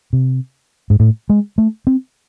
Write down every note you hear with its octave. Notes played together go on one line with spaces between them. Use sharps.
C3
G#2
A2
G#3
A3
C4